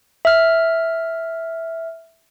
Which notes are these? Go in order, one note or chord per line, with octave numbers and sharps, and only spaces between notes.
E5 F6